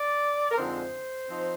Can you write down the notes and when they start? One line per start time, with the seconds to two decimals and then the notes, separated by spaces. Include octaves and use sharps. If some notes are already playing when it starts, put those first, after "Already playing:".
Already playing: D5
0.52 A#4
0.56 F2 D3 G#3 C4 D#4 C5
1.30 F3 C4 D#4